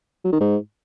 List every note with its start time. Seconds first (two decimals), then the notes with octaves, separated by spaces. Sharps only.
0.24 F#3
0.32 D#3
0.40 G#2